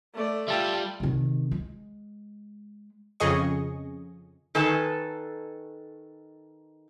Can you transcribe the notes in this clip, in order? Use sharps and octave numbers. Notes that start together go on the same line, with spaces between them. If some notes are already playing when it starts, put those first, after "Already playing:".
A3 D5
G3 F4 E5 G5 A5
C3 D#3
G#3
F2 C#3 G#4 D#5 C#6
D#3 A4 B4 G#5 A5